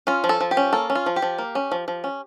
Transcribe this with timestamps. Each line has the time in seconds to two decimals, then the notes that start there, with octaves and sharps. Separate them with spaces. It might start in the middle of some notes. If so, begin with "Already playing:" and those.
0.07 C#4 F4
0.24 F3
0.29 A4
0.41 F3
0.51 G4
0.57 C#4
0.73 A#3 A4
0.90 C#4
0.95 F4
1.06 F3
1.16 G4
1.22 F3
1.38 A#3
1.55 C#4
1.72 F3
1.88 F3
2.04 C#4